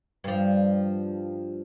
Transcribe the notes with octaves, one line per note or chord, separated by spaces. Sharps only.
G2 F3